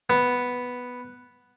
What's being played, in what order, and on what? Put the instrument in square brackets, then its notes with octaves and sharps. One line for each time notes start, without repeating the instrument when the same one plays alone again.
[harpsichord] B3